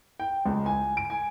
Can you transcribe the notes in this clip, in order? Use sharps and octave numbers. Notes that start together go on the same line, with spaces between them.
G5
C#2
G#5
D7
G#5